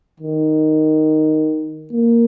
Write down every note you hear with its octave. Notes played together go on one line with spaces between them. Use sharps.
D#3
A#3